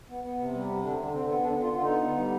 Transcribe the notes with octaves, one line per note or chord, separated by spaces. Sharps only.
B3
B3
C3
G3
C3
D3 D4
D3
D3 C4
B3
D3 D4
D3 F4
D3 F4
B3 D#4
B3
G3